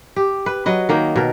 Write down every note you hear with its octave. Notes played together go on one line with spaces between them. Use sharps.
G4
B4
F#3 B4 D#5
D#3 A#3 D#4
B2 A#4